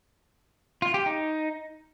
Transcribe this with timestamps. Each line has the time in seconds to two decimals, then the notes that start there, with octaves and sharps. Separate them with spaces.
0.82 F4
0.94 G4
1.06 D#4